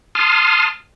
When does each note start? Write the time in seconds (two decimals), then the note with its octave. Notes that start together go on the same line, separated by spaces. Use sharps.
0.15 A5 C6 D#6 F6